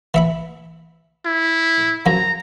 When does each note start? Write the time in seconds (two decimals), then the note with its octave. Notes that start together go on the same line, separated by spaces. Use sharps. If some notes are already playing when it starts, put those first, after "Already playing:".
0.14 E3 E5 B5
1.26 E4
2.06 F#2 F3 A#5